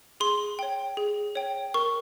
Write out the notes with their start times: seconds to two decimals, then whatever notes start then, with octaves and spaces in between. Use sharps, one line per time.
0.20 G#4 C6
0.59 C#5 G5
0.97 G#4
1.35 C#5 G5
1.74 A#4 C#6